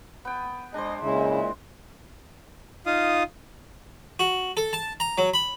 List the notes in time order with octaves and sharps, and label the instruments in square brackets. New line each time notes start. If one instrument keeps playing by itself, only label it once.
[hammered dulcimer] B3 G5
[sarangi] G#3 [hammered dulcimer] D4 C5 [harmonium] D#5
[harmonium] A#2 G#3 [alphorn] C#3 [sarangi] E4
[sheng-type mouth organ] D#4 F4 F5 D#6
[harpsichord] F#4
A4
A5
A#5
F#3
B5